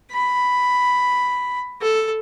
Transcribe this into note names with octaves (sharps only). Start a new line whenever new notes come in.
B5
A4